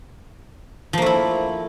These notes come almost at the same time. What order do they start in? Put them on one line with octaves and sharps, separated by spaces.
F3 A#3 A3 E4